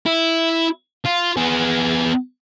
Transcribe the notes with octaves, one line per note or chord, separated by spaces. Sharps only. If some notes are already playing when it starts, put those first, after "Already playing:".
E4
F4
B3 G#4